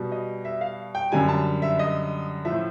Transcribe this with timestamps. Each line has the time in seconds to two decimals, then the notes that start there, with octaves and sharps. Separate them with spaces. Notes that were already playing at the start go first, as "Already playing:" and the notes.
Already playing: B2 G3
0.12 D#5
0.45 E5
0.61 F5
0.95 G5
1.12 F#2 D3 G3 G#5
1.29 A5
1.62 E5
1.79 D#5
2.45 F3 E5
2.50 A2